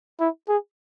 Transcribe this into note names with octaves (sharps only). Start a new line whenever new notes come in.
E4
G#4